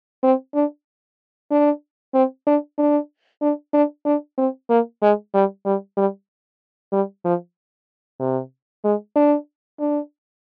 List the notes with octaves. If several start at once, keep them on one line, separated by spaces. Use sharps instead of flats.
C4
D4
D4
C4
D4
D4
D4
D4
D4
C4
A#3
G#3
G3
G3
G3
G3
F3
C3
G#3
D4
D4